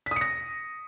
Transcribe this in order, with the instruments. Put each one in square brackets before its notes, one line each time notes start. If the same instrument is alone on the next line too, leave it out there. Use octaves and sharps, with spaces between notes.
[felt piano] B6
D#6
C#7
A#6